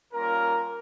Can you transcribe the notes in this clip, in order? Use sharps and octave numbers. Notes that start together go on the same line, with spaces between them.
G3 A#3 C#4 F4 A#4